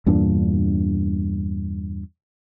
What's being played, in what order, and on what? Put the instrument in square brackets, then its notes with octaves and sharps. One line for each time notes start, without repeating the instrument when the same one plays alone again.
[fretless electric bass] E2 G2 A#2 D4